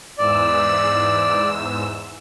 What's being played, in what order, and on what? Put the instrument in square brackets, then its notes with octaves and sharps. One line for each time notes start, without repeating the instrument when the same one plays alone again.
[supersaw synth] E2 G#2 E6 [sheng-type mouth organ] D5